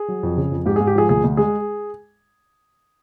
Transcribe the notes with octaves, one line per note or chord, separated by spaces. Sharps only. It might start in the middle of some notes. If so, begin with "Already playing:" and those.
Already playing: G#4
F#3
F2
C#3
F2
G#2 G4
G#2 G#4
G4
F3 G#4
D2 G#4
D2
G#3 G#4